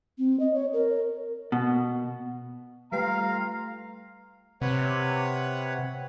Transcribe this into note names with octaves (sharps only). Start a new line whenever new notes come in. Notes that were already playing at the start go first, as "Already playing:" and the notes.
C4
D#5
C#5
A#4
B2
G3 A3 F4 B4 F5 G5 A#5
C3 B4 C#5 F#5